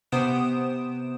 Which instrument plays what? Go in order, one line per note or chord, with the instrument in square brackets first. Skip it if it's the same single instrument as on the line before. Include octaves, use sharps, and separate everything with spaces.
[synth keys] C3 B3 C5 D#6 D7 E7